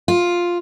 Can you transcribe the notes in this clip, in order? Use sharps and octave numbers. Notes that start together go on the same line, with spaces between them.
F4